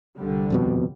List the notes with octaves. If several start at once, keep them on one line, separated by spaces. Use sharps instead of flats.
C2 D3 G3
D#1 F2 B2